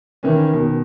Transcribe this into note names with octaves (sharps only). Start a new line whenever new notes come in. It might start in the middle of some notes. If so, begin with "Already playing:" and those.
D#3 E3 C#4
B2 D#3